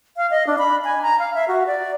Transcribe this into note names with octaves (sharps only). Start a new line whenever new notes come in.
F5
D#5
D4
B5
G#5
A#5
F5
E5
F#4
D5